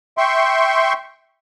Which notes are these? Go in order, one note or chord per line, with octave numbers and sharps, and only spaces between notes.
E5 G5 C6 C#6